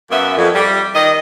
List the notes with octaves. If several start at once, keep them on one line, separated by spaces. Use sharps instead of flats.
F#2 A#3 B3 E5
F2
G3
D#3 D#5